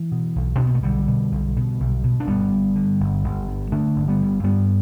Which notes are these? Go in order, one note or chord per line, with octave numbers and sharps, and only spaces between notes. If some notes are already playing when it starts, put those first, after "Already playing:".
Already playing: E3
B2
B1
B2 D4
B3
A3
B1 D3 G3
B2
B1
B2
B1
B2
D4
G1 G3 B3
G2
D3
G1
G1
G2
D3 A3 D4
G1
G3 B3
G1
G2 G3 B3